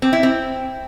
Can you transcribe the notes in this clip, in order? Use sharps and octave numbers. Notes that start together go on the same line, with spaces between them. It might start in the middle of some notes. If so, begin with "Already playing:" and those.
C4
E4
C4